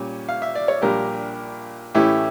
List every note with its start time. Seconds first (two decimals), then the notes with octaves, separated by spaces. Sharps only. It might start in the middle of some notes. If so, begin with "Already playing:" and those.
Already playing: A#2 G3 C#4
0.29 F5
0.42 E5
0.55 D5
0.68 C#5
0.82 A#1 A#2 G3 D4 G4 A#4
1.95 A2 E3 A3 C#4 E4 G4